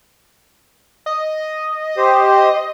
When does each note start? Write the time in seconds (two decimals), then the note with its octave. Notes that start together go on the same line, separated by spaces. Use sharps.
1.06 D#5
1.97 G4 C5